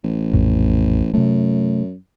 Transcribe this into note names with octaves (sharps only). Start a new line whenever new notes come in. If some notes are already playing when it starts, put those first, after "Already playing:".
A1
A#1 F2 A2
F#2 C3 A3